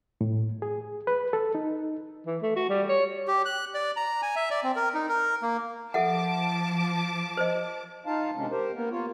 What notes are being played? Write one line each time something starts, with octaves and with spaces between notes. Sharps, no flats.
A2
G#4
B4
A4
D#4
E3
A3
F#4
G3
C#5
G4
F#6
D5
A#5
G#5
E5
D5
C4
A#4
D#4
A#4
A#3
F3 A4 E5 F#5 A5 D6
C5 D#5
D#4 F4 F5 A5
C3 D#3 G#3 C#4 D4
G4 A#4 C5
A#3 B3 A#4
A#3 F4 C#5